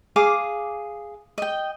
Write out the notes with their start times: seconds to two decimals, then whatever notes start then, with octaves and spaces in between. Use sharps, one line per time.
0.16 G#4 F5 D6
1.38 D#5 G5